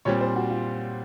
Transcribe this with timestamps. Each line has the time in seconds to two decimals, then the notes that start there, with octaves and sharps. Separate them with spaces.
0.05 A#2 G3 C4 C#5
0.21 C5
0.36 F#4
0.50 F4